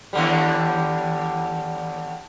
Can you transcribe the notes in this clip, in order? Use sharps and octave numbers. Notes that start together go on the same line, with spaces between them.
D#2 D3 G3